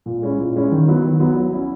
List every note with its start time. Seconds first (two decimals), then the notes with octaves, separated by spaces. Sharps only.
0.06 A#2
0.22 G#3 C#4 E4
0.38 A#2
0.55 G#3 C#4 E4
0.71 D#3
0.88 F#3 B3 E4
1.04 D#3
1.20 F#3 B3 E4
1.36 F#3
1.53 C#4 E4